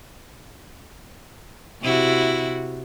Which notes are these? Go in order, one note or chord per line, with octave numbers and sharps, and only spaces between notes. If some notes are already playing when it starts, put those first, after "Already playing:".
C3 E4 F#4